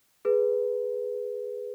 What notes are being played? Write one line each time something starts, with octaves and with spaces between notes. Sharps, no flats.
G#4 B4